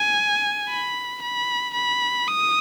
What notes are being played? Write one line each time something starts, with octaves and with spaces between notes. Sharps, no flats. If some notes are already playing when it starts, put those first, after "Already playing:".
Already playing: G#5
B5
B5
B5
D#6